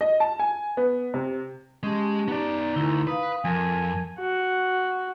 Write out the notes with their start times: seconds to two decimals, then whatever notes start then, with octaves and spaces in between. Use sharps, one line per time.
0.01 D#5
0.20 A5
0.39 G#5
0.77 B3
1.14 C3
1.83 G#3 C#4 G4 A5
2.28 B3 D#4 D5
2.76 D2 E4 A#4
3.07 B4 F5 D#6
3.45 F2 A#4 G#5 A5
4.19 F#4